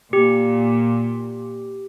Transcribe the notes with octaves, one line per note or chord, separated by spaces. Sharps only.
A#2 G4